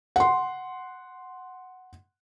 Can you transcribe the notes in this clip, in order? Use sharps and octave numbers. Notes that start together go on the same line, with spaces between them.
F#5 C6